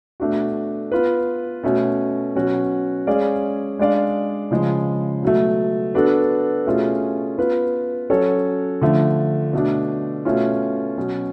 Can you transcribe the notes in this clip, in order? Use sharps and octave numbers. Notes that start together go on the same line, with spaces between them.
B2 A3 D4 F#4
B3 F4 B4
B2 A3 C#4
B2 F#3 C#4 F#4
G#3 C#4 G#4 D5 F5
G#3 D4 G#4 D5 F5
C#3 F3 G#3
B2 F#3 A3
B3 D4 F#4 A4
B2 A3 C#4 F4 G#4
B3 F4 B4
F#3 C#4 F#4 A4 C#5
D3 F3 A3
B2 A3 D4
B2 A3 C#4 F4
B2 F#3 C#4